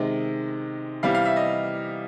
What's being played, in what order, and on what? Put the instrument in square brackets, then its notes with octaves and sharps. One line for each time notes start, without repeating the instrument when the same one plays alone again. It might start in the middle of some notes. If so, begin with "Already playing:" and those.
Already playing: [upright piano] C3 D#3 G#3
C3 E3 G3 F5
F5
E5
D#5